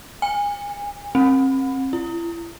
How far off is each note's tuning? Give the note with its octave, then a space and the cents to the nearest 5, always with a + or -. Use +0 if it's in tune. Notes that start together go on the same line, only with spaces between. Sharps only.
G#5 -30
C4 +35
E4 +40